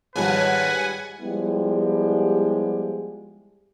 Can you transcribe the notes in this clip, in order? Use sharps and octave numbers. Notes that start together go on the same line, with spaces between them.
D#2 G#2 F3 G3 B4 F#5 G#5
F3 G3 G#3 B3 E4 G4